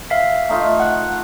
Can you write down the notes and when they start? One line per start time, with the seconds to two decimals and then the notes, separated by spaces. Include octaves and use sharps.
0.10 E5 F5 B6
0.49 A3 D#4 F4
0.80 F#5 F#6